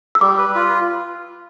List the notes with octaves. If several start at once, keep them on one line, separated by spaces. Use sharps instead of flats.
E6
G3 D6
B4
F4